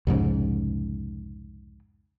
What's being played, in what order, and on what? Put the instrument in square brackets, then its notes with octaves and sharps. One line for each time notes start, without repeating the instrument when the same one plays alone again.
[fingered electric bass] C2 F2 G#2 C#3